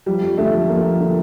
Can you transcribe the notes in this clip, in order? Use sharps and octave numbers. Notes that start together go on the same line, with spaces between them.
F3 G3
F2
D3 A3
F2
F3 A#3
F2
D3